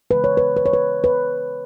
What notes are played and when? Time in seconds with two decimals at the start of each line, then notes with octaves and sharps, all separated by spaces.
0.11 C#3 E3 G#3 B4
0.24 C#5
0.37 B4
0.56 B4
0.66 C#5
0.73 B4
1.04 B4